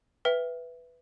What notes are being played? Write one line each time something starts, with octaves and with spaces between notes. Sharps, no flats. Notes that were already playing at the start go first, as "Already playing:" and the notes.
B4 E5 G5